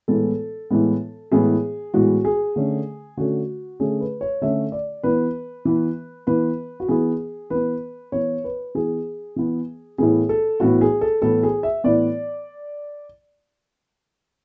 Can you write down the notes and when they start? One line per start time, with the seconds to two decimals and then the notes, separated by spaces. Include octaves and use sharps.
0.08 A2 E3 G#3 B3 A4
0.71 A2 E3 G#3 B3
1.32 A2 E3 G#3 B3 G#4
1.94 A2 E3 G#3 B3 F#4
2.25 G#4
2.56 D3 A3 C#4
3.17 D3 A3 C#4 F#4
3.80 D3 A3 C#4 G#4
4.00 B4
4.21 C#5
4.41 D3 A3 C#4 E5
4.72 D5
5.03 E3 B3 B4
5.65 E3 B3
6.27 E3 B3 B4
6.80 F#4
6.88 E3 B3 G#4
7.50 E3 B3 B4
8.12 E3 B3 C#5
8.44 B4
8.75 E3 B3 G#4
9.36 E3 B3
9.98 A2 E3 B3 G#4
10.29 A4
10.60 A2 E3 B3 F#4
10.81 G#4
11.01 A4
11.22 A2 E3 B3 A4
11.43 G#4
11.63 E5
11.84 A2 E3 B3 D5